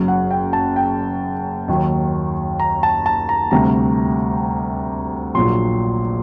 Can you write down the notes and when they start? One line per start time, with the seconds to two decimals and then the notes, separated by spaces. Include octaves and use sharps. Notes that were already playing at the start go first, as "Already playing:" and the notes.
Already playing: F#1 F#2 F#3
0.08 F#5
0.31 G5
0.53 A5
0.76 G5
1.68 D#2 D#3 F#3
2.60 A#5
2.83 A5
3.06 A5
3.29 A#5
3.51 D2 C3 G3 A#5
5.35 A#1 A#2 F#3 C6